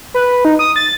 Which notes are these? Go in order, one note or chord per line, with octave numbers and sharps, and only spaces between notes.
B4
D#4
D#6
A6